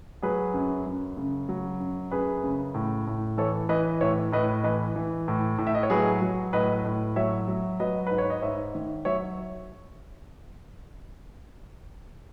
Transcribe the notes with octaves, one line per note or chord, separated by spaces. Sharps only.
F#3 G#4 B4
F#2
F#2
C#3
F#3
F#2
F#2 G#4 B4
C#3
A2
A2
E3 A4 C#5
E3 B4 D#5
A2 C#5 E5
A2 B4 D#5
E3 B4 D#5
E3
A2
A2
E5
D#5
C#5
F#3 G#4 B4
F#3
A2 B4 D#5
A2
F#3 C#5 E5
F#3
F#3 B4 D#5
G#2 B4
C#5
D#5
G#2 C#5 E5
D#3
F#3 C#5 E5